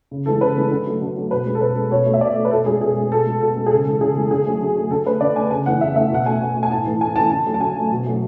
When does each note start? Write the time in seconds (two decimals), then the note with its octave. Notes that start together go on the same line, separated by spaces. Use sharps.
0.11 C#3
0.26 E3 G#3 A4
0.41 C#3 B4
0.57 E3 G#3
0.71 D3
0.86 F#3 A3
1.02 D3
1.16 F#3 A3
1.31 B2 B4
1.46 G#3
1.55 A4
1.61 B2 B4
1.76 G#3
1.91 B2 C#5
2.06 A3
2.14 E5
2.21 B2 D5
2.36 A3
2.45 B4
2.51 B2 A4
2.66 G#3 G#4
2.81 B2 G#4
2.96 G#3
3.11 B2 A4
3.26 G#3
3.41 B2 A4
3.56 G#3
3.66 G#4
3.71 C#3 A4
3.86 E3 G#3 A4
4.01 C#3 G#4
4.16 E3 G#3
4.31 D3 G#4
4.46 F#3 A3
4.61 D3
4.76 F#3 A3
4.91 D3 A4
5.06 A3 B4
5.21 D3 D5
5.36 A3 G#5
5.51 C#3 G#5
5.66 E3 A3 F#5
5.81 C#3 E5
5.96 E3 A3 E5
6.11 B2 F#5
6.26 A3 G#5
6.40 B2 F#5
6.56 A3
6.63 G#5
6.71 A2 A5
6.86 E3 A3
7.01 A2 G#5
7.16 E3 A3 A5
7.30 D3 A5
7.46 F#3 A3
7.54 A5
7.60 D3 G#5
7.76 F#3 A3
7.91 B2
8.07 F#3 A3